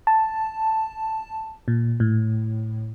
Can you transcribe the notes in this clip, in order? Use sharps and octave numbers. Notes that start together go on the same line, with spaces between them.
A5
A#2
A2